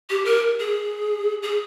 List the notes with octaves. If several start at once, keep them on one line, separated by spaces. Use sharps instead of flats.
G4
A#4
G#4
G#4